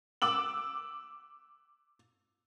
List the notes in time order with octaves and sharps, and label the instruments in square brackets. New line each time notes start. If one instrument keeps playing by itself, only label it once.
[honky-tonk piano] D6 E6 F#7